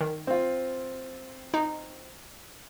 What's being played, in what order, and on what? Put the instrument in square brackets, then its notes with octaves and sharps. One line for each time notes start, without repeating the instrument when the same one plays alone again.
[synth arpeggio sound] D#3
[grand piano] C4 F4
[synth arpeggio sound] D#4